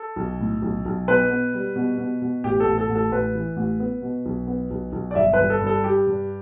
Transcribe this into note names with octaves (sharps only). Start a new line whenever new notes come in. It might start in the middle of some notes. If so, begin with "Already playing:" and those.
Already playing: A4
B1
A2
B1
B1
B2 B4
B3
G3
B2
B2
B2
A1 G4
A4
A1
A4
A1
A4
A1 B4
E3
A1
B3
B2
B1
B3
B1
B1
D5
G1 E5
B4
G1
A4
G2
A4
G3 G4
G2